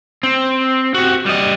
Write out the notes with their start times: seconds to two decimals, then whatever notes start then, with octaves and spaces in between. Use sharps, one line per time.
0.23 C4
0.94 F#4 G4
1.26 G3 D#5